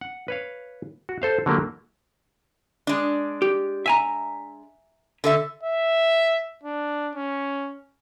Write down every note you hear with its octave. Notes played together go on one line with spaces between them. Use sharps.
F#5
B4 C#5 F5
F#4
A4 C5 F5
D3 F#3 A3 A#3 G4
G#3 D4
G4
E5 G#5 A#5
D3 A4 E5
E5
D4
C#4